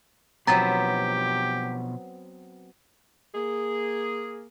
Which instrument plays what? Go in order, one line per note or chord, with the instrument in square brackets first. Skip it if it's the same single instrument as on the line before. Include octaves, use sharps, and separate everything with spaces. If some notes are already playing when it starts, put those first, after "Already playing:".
[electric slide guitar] B2 F3 [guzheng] F#3 B3 C4 [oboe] G4 [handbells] A#5 A6
[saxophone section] A#3 G#4